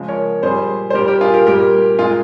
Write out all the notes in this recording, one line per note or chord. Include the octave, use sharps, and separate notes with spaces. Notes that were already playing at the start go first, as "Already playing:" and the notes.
Already playing: C#3 F3 G#3
A#4 C#5
A#2 G3 G#4 C5
C5
A#2 G3 G4 A#4
G4 A#4
F4 G#4
G4 A#4
A#2 G3 G4 A#4
A#2 G#3 F4 G#4